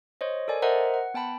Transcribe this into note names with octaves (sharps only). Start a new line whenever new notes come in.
C5 C#5 D#5
A4 A#4 D5 G#5
A#4 C5 D#5 E5 F#5 A#5
F#5
B3 G5 A5 B5